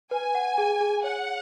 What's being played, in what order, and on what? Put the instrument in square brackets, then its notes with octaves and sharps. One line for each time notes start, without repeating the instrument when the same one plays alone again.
[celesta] B4 [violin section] G#5
[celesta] F#5
G#4
G#4
[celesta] C#5 [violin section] F#5